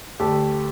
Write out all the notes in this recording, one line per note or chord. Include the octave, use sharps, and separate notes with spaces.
D2 G4 A4